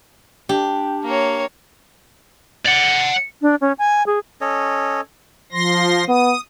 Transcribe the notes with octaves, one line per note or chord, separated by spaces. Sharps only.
D4 G4
A#3 C#5
D5 F#5
D4
C#4
G#5
G#4
C#4 A4 C#5 D#5
F3 C6 A#6
B3 D#6